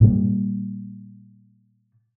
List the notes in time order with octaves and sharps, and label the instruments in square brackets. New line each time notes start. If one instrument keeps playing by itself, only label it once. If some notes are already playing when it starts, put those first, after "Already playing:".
[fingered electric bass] A#2 G3